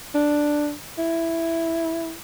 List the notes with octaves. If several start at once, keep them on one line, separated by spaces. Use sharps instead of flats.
D4
E4